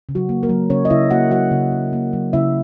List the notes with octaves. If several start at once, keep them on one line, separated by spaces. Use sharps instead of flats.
C#3
F#3 F#4
A#3
A#3 A#4
F#3
C#3 C#4 C#5
D#5
C#3 E4 E5
A#3 F#4 F#5
F#3 F#4 F#5
C#3
C#3
A#3
F#3
C#3 E4 E5